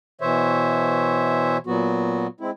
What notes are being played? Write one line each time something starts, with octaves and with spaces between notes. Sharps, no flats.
B2 E3 C5 C#5 E5
A#2 F#3 B3 F#4
G#3 C4 E4